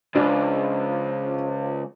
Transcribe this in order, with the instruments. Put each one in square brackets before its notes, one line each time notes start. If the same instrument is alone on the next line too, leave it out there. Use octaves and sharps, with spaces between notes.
[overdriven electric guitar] C#2 [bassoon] F3 [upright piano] D4